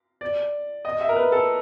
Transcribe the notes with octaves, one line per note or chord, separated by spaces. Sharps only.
D5
D#5
E5
A#4
B4
A4